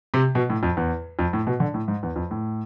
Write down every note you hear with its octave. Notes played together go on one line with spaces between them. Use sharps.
C3
B2
A2
F2
E2
F2
A2
B2
D3
A2
G#2
E2
F2
A2